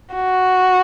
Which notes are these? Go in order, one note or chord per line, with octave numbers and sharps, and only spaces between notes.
F#4